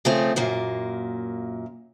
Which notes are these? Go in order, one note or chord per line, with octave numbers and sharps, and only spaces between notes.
C#3 F3 A3 C4
F#2 A#2 A#3